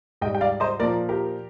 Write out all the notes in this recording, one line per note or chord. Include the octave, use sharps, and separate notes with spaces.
G#2 G3 D#5 G5
G5
D5 F5
C5 D#5
A#2 F3 A#4 D5
G4 A#4